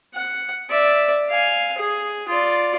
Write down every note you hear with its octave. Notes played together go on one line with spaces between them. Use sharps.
F#5
D5 E5
F5 G#5
G#4
F4 D5